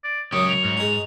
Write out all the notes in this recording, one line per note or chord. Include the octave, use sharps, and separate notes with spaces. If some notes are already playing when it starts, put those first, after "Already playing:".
D5
C#2 F#2 F#3 G4 C#5 D#6
F7
G#2
D#4 G#4